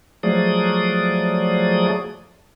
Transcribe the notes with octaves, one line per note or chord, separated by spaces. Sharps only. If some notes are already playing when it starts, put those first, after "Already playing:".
F3 F#3 A3 G#4 D5 D#6